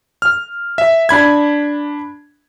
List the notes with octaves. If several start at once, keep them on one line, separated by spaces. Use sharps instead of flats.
F6
E5
D4 B5 G#6